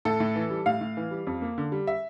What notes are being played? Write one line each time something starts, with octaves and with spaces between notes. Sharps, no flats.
A2 A4
A2
E3
G3
A2 F5
A2
E3
G3
F2
A#3
D3
G3
E5